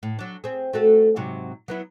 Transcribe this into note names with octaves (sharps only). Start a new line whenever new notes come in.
A2
F#3 D4
C4 G#4
A3 F#4 A4
G#2 C3 F#3
F#3 B3 E4